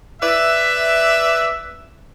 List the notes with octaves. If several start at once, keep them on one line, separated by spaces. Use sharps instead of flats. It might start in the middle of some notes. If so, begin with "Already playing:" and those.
B4 D5 E5